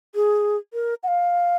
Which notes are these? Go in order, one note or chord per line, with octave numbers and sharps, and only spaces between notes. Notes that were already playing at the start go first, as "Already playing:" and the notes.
G#4
A#4
F#5
F5